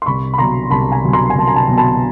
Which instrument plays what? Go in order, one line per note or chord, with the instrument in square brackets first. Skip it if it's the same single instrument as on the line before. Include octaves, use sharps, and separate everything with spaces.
[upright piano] C6
C2 B5 C#6
B5
B2 F#3 A#5 C6
C2 A5 B5
G#5 A#5
B2 F#3
A#5 C6
G#5
C2 A5
A#5
A5 B5
B2 F#3
A5 B5